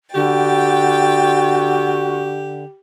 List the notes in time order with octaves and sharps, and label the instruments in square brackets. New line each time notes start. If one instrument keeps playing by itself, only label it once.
[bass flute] D3 [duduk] F#4 [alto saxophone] G4 [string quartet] G5 A6